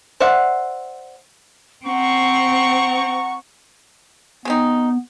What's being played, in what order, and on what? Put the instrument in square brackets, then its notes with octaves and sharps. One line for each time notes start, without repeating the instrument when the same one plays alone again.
[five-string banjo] C5 D5 E5 F#5
[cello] C4 [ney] F#5 [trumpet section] A#5 C#6
[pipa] G#3 C4 D#4 [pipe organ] B3